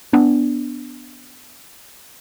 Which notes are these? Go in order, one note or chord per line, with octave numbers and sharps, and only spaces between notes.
B3 D4